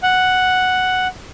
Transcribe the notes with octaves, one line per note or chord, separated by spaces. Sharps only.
F#5